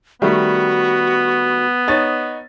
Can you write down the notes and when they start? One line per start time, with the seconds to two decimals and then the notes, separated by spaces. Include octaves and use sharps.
0.22 D#3 G3 A3 B3 F#4
1.88 D#4 C#5 A6